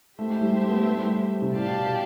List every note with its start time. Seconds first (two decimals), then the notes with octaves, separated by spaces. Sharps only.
0.18 A3 G4 C5 E5
0.30 A3
0.41 G3
0.52 G3
0.61 A3
0.69 B3
0.78 A3
0.87 B3
0.95 A3
1.03 G3
1.42 C3
1.53 A2 G4 D5 F5 A5
1.71 B2
1.87 B2